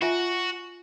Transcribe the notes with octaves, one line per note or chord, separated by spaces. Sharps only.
F4 F#4 E5 G#5